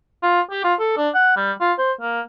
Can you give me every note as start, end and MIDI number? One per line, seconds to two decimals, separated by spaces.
0.23 0.41 65
0.50 0.61 67
0.64 0.74 65
0.79 0.94 69
0.97 1.09 62
1.14 1.35 78
1.37 1.52 55
1.61 1.73 65
1.78 1.92 72
2.01 2.21 58